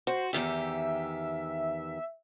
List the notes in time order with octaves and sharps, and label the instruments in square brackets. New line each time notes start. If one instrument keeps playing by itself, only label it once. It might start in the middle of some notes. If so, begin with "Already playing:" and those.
[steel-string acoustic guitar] F#4 [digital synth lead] C5
[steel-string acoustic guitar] E2 D#3 G4 [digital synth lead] E5